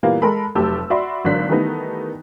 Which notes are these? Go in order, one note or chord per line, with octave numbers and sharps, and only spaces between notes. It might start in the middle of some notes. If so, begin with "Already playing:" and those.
A#2 E3 G3 A#3 B3
G#3 A4 A#4 B5
F1 F#3 A3 G4 A5 E6
F#4 D5 E5 B5 C6
G#1 D3 F#3 D5 F#6 B6
D#3 E3 G3 A3 B3 D#4